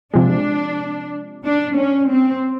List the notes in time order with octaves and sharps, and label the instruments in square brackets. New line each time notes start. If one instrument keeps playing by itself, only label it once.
[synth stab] C3 F3 G#3 [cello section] D4
[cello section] D4
C#4
C4